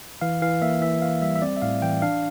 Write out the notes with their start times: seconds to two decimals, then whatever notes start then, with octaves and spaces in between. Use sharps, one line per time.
0.21 E3 F5
0.42 E3 F5
0.62 A#3 E5
0.81 E3 E5
1.02 E3 F5
1.22 G3 E5
1.36 E5
1.42 C4 D5
1.57 E5
1.62 A2 F5
1.82 E3 G5
2.02 D4 F5